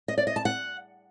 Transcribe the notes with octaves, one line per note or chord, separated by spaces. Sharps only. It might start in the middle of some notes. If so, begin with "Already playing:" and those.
D#5
D5
D#5
A5
F#5